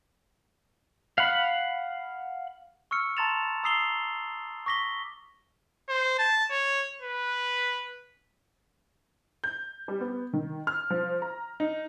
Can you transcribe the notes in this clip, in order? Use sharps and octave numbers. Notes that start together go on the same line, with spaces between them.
F5 F#5 B5
C#6 E6 F6 C#7
A5 A#5 C6 A6 E7 F7
A#5 D#6 E6 C7 F7 G7
C#6 D6 A#6 B6 G7
C5
A5
C#5
B4
G6
G3
B3
D#3
F6
F3
A#5
D#4